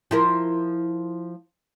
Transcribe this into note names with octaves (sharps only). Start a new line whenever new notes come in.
F3 E4 A#4